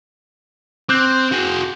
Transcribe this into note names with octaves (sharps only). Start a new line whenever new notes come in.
C4 D6 F#6 G6
F#4 G#4